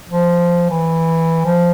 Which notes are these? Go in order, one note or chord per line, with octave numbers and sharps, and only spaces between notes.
F3
E3
F3